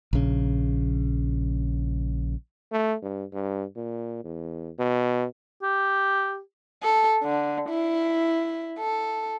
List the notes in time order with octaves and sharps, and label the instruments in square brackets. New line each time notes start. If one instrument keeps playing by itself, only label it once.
[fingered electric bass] A#1 C#3
[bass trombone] A3
G2
G2
A#2
E2
B2
[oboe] G4
[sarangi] A4
D3
E4
A4